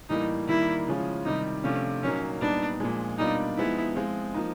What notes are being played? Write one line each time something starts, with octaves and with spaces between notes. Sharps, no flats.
A2 E3 G3 A#3 D#4
D#3 G3 A#3 E4
C#3 F3 G#3 C#4 F4
C3 D#3 G3 D#4
C3 F3 A3 C#4 D4 F4
A#2 F#3 A#3 C#4 D#4
A#2 G3 B3 D4 D#4
A#2 F3 G#3
B2 G3 A#3 D4 D#4 F4
F3 G#3 B3 D#4 E4
F3 G#3 C4 F4
F3 A#3 D#4